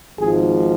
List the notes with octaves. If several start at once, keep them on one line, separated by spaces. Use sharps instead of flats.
G#1 G#2 F3 G#4